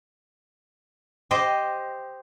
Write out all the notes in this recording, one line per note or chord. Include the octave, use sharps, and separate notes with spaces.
G4 C5 D#5